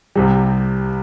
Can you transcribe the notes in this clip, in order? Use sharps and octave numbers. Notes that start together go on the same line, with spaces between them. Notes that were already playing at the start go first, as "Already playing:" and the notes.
C2 C3 G3